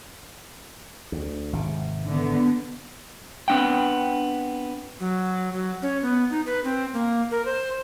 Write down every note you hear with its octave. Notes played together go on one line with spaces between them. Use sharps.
D2
G#1 C3
D3 B3
B3 C4 D4 F#5 G5
F#3
F#3
C#4
B3
D#4
B4
C4
A#3
A#4
C5